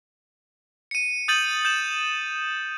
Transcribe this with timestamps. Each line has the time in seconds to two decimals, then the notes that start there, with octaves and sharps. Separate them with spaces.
0.91 C#7 D#7
1.28 D#6 G6 A6 D#7 F#7
1.65 G6 E7 F#7